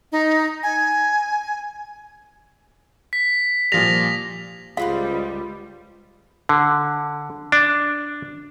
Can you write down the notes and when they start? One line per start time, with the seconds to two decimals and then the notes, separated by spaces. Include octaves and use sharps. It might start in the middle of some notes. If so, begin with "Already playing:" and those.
0.12 D#4
0.63 G#5
3.13 B6
3.72 A#2 F3 G3 A#6 F7
4.77 C#2 G3 G#3 F4 B4 C5 F5
6.49 D3
7.52 D4